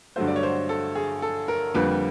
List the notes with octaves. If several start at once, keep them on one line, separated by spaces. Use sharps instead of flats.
G2 D3 F#3 A3 C5
D5
C#5
C5
A4
G#4
A4
A#4
F2 D3 G3 A#3 B4